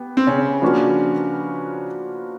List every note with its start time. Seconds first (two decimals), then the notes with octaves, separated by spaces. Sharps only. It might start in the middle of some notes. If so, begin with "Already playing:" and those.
Already playing: B3 G4
0.17 C4
0.27 C#3 C#4
0.62 F3 A#3 D4 F#4 B4